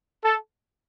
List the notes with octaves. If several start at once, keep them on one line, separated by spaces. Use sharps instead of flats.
A4